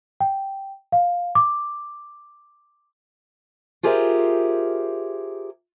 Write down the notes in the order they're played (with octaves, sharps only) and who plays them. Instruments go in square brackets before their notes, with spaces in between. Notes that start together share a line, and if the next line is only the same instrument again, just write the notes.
[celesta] G5
F5
D6
[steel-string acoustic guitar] F4 G4 G#4 A#4 C5 E5